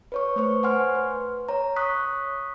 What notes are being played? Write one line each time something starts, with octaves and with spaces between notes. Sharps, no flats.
B4 C#5 C#6
A3 B4 C5 C#6
C5 F#5 G#5 C6 F6
B4
C#5 A#5
C#6 D#6 F#6 B6